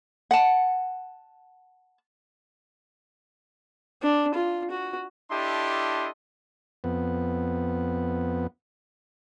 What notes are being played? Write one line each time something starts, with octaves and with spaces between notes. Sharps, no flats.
F#5 A5
D4
F4
F#4
D4 E4 G4 A4 D#5 C6
F2 B3